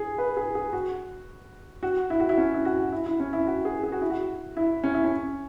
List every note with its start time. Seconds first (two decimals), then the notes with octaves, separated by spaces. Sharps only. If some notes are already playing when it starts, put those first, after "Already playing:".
Already playing: G#4
0.18 B4
0.37 G#4
0.55 G#4
0.73 F#4
1.83 F#4
2.10 E4
2.20 F#4
2.29 E4
2.38 C#4
2.54 E4
2.65 F#4
2.92 E4
3.06 E4
3.20 C#4
3.33 E4
3.47 F#4
3.65 G#4
3.83 G#4
3.92 F#4
4.01 E4
4.10 F#4
4.57 E4
4.84 C#4
4.94 E4
5.04 C#4